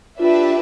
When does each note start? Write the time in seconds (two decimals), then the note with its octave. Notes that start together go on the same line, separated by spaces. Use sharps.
0.19 D4 F4 G4 B4 E5